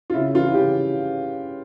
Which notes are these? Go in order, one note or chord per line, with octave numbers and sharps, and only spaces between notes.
F4
C#3 E4
E3 F4
C#3 G4